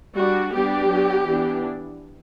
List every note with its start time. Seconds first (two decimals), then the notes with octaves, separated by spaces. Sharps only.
0.15 G3 D4 F#4
0.52 G3 B3 D4 G4
0.90 F#3 B3 D4
1.27 E3 B3 D4